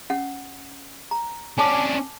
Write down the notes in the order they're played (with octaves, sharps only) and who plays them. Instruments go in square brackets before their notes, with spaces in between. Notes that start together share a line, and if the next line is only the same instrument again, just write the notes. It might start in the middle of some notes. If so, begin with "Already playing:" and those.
[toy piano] C#4 F#5
A#5
[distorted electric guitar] C#4 D4 [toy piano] G#5 A5 D6